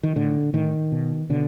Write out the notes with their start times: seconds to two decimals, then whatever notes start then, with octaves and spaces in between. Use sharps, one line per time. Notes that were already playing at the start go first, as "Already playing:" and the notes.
0.03 D#3
0.16 A2 D3
0.53 A2 D#3
0.92 B2
1.30 B2 D3